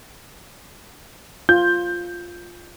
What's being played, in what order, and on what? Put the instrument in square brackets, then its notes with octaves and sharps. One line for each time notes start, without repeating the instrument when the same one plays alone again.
[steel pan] F4 [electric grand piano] G6